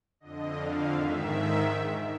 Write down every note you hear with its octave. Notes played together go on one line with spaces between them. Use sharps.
F2 D3 D#5
F5
G#2 D#3 E5